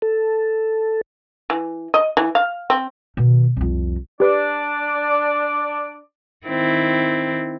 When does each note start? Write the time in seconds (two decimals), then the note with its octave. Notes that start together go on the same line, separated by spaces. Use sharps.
0.02 A4
1.50 E3
1.94 D#5
2.17 E3
2.35 F5
2.70 C4
3.17 B2 D#3
3.57 C2 F2
4.20 D4 G4 B4 D5
6.47 D#3 C4 E4